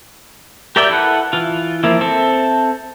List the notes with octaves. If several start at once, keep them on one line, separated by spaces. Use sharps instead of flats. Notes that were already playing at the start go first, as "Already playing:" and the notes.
G4 A#4 D5 E5 G5
E4 A4 B4 F#5
E3 F4
F3 A#3 E4
C4 A4 E5